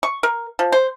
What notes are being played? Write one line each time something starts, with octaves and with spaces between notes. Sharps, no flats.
C#6
A#4
F3
C5